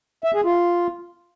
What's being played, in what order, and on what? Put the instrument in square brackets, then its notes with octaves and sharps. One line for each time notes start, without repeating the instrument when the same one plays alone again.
[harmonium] E5
G#4
F4